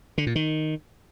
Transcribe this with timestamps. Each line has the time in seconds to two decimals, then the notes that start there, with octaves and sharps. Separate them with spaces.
0.18 D3
0.27 A#2
0.35 D#3